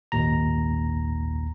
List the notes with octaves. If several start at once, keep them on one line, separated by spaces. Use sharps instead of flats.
G#1 D#2 A#2 A#5